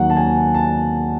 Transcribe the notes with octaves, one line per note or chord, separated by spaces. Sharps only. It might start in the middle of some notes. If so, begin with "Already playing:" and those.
Already playing: D#2 D#3 F#3 F#5
A5
G#5
A5